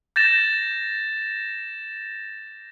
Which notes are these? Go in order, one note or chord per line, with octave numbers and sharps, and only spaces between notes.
G6 A6 A#6 E7